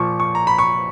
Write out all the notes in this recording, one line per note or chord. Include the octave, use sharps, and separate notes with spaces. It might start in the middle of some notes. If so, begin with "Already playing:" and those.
Already playing: A#2 F3 C#6
C#6
A#5
B5
C#6